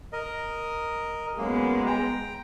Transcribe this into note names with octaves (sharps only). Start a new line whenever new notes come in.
A#4 D#5
F#2 G#3 A#3 B3
G5 A#5